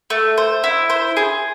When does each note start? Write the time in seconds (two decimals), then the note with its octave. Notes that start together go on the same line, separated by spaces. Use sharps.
0.10 A3
0.38 C5
0.64 E4
0.90 C5
1.17 G#4